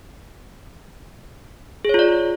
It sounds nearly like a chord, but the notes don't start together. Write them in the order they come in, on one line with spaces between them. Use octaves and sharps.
G#4 C#5 F4 D5